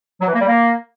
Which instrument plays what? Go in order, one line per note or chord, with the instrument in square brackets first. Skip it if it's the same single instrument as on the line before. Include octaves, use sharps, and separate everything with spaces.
[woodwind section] F#3
E3
A#3
G3
A#3